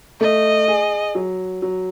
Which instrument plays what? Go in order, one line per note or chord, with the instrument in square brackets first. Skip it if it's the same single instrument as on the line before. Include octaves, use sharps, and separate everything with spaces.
[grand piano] A3 [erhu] D#5
[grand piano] G#4
F#3
F#3